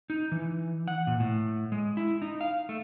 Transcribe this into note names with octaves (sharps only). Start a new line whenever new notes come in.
D#4
E3
F#5
A#2
A2
G#3
E4
D#4
F5
A3